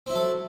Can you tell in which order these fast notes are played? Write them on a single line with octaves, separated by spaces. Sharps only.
C4 E4 F#3 A4